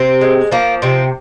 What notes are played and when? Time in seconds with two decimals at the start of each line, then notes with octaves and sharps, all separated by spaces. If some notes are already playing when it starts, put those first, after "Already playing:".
Already playing: C3 C4
0.21 G#3
0.52 F3 A#3
0.82 C3 C4